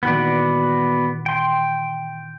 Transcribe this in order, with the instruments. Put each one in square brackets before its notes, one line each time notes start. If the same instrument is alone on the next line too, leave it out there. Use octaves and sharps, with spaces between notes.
[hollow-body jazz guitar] A#2 D#3 E3 [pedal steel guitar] B3 F#4 D5
[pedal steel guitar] G5 C6